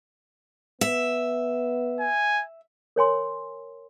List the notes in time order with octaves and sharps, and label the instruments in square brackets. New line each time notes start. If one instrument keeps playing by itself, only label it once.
[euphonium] B3 [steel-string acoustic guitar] E5
[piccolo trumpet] G#5
[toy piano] A#4 C#5 G#5 C6